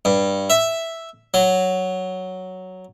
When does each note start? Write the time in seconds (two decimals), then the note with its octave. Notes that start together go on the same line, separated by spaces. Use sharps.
0.05 G2
0.50 E5
1.34 F#3